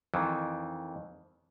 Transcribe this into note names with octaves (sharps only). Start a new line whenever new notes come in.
F2 D#3 E3